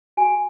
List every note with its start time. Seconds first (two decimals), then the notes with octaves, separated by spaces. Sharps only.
0.17 F#4 G#5